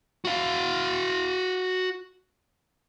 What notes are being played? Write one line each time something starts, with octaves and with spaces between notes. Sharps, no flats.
F#4 F5